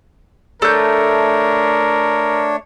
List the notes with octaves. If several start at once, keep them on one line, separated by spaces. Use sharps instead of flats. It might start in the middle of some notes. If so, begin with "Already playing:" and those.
A3 D4 A#4 C#5 G6